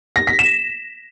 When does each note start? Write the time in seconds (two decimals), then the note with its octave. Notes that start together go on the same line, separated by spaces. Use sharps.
0.16 A#6
0.27 B6
0.39 E7